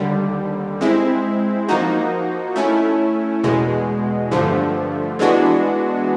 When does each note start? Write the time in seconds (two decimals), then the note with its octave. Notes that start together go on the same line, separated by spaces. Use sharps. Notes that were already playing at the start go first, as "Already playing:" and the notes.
Already playing: D#2 D3 G3
0.81 G#3 C4 E4
1.68 F3 A#3 D#4 F#4
2.56 A3 C#4 E4
3.43 E2 B2 G#3
4.31 G2 D3 F3 A3
5.19 E3 G#3 B3 D4 F#4